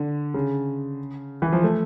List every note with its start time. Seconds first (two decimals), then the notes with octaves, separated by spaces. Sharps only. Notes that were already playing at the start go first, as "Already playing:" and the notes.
Already playing: D3
0.34 C#3
1.42 E3
1.53 F3
1.64 A3